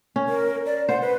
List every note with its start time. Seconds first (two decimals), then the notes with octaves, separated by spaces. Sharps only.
0.16 C#4
0.29 A#4
0.66 D5
0.89 C5 F#5
1.01 B4